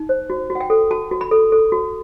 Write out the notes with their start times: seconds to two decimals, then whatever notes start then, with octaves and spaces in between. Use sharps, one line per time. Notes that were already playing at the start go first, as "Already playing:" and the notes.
Already playing: D#4
0.09 C5
0.30 F#4
0.50 F#4
0.55 F#5
0.60 G5
0.70 A4
0.91 F#4 A5
1.11 F#4
1.21 B5
1.31 A4
1.52 A4
1.72 F#4